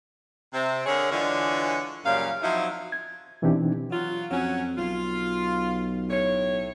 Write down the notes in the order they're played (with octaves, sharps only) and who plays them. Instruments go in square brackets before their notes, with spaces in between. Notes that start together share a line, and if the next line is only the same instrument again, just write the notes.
[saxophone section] C3 C4 E5
D3 G#4 A#4 C#5
D3 E3 G#3 D4 F4 C#5
F#2 A#2 C#3 G3 F5
F3 F#3 C4 D#4 E4
[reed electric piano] G#6
B2 E3 C4 D4 D#4 G4
[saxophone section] F#3 F4
[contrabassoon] F2 [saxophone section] F#3 C#4
[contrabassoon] B1 [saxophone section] F4
[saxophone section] A2 C#5